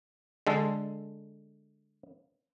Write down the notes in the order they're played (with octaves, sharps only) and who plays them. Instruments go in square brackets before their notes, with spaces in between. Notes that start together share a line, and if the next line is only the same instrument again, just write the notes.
[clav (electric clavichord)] D3 G#3 A4